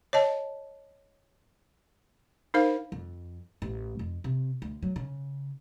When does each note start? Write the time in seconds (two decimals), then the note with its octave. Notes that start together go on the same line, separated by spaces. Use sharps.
0.13 C#5 D#5 A5
2.54 D#4 A#4 C5 F5
2.92 F2
3.62 A1
3.99 F2
4.24 C3
4.62 D2
4.83 F#3
4.96 C#3